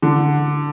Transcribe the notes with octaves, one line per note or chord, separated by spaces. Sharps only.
D3